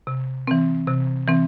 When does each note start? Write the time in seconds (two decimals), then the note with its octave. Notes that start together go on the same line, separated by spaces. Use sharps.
0.07 C3
0.47 E3 C4
0.88 C3
1.28 E3 C4